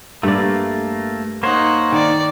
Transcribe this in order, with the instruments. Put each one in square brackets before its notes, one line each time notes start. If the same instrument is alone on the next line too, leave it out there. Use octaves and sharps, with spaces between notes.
[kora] G2 D5 [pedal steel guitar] A3 A#3
[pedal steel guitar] A#3 C5 C#5 [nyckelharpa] D#4 F#5
[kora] D#3 [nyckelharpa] D5